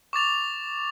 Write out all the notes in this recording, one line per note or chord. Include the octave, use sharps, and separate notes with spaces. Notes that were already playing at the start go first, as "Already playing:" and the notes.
C#6 D6 A6 F7